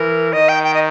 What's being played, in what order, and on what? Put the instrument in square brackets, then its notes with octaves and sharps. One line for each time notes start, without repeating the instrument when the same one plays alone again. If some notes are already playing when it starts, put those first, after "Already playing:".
Already playing: [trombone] E3 [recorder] A#4
[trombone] D#3 [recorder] D#5
[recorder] G5
G5
D#5